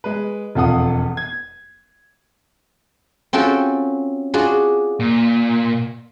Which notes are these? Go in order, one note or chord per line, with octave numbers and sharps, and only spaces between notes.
G#3 B4
E1 F2 F4 A4 F#5 D#6
G#6
C4 C#4 F4 F#4 A4 G5
D4 F4 F#4 G#4
A#2